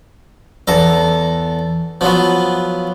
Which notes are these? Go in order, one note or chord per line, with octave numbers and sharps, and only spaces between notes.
E2 A4 A#5
F3 F#3 B3